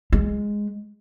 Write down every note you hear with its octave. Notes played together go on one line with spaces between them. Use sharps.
G#3